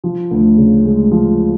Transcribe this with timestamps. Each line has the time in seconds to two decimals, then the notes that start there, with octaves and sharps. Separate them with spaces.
0.04 F3
0.31 D2
0.57 C#3
0.85 G#3
1.11 F3